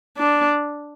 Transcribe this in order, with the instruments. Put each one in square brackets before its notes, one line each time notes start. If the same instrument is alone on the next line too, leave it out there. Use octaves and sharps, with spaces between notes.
[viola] D4